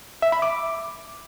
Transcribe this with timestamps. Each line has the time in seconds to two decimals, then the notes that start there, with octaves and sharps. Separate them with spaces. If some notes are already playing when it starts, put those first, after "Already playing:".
0.22 E5
0.32 B5
0.42 D6